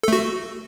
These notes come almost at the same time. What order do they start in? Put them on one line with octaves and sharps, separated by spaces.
A4 A3 F#4